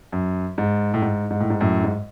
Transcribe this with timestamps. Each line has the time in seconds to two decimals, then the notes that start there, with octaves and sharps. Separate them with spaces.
0.12 F#2
0.58 G#2
0.94 A2
1.02 G#2
1.31 G#2
1.40 A2
1.50 G#2
1.61 F#2 A2
1.84 G#2